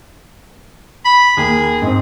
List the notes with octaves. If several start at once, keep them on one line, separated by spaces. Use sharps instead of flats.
B5
D#2 A#3 G#4
G#2 C4